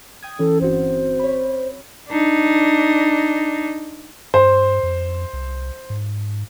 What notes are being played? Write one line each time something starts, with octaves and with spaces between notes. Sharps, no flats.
G5 D#6 G#6
E3 C#4 A4
G1 C4 F#4 C5
C#5 B5
D4 D#4
G2 C5
F2
C2
G#2